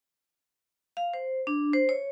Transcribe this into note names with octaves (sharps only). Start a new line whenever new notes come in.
F5
C5
D4
C5
C#5